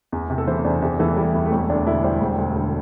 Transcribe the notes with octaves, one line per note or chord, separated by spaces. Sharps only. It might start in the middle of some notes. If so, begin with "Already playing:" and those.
E2
C3
A4
E3 C5
E2 D4
E2 G4
E3 A4
G3 E4
E2
A3
E1 C4
D2 D4
D3 E4
G3 C5
E1
D2
D3